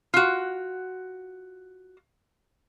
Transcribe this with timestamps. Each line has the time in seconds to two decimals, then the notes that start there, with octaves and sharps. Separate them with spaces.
0.14 F4 F#4